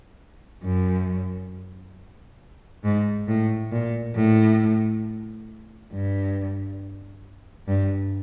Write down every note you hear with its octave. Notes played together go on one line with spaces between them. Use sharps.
F#2
G#2
A2
A#2
A2
G2
G2